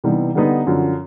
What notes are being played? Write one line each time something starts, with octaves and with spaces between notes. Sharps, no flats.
C3 E3 G3 B3 D#4
D3 G3 B3 D#4
F#2 D3 F3